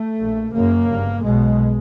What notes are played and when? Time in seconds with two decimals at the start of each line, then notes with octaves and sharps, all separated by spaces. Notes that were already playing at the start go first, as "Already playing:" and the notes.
Already playing: A3
0.18 A#1 A#2
0.53 F#1 F#2 C#3 A#3
0.88 G1 G2
1.23 B1 B2 G#3